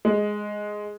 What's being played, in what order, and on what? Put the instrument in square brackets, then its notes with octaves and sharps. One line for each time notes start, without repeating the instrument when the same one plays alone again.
[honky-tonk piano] G#3